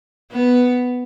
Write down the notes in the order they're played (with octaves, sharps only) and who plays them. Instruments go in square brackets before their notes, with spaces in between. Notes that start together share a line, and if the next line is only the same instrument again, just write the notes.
[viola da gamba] B3